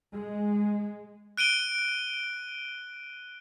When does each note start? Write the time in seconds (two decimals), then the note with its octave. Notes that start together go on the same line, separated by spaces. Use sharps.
0.13 G#3
1.37 F#6 D7 D#7 G7